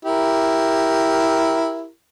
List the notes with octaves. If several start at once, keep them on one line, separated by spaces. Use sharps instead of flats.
E4 G4 A#4